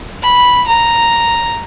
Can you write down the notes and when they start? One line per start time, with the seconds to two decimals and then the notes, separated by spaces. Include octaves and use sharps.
0.22 B5
0.68 A#5